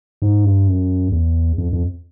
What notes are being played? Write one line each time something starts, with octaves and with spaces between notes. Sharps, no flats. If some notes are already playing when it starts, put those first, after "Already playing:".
G#2
G2
F#2
E2
F2
F2